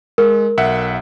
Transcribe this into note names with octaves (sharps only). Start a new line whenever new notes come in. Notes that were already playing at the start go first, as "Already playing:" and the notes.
G#3 A#4
B1 E5 F#5